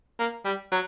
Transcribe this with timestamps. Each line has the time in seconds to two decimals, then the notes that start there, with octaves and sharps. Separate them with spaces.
0.19 A#3
0.45 G3
0.72 F#3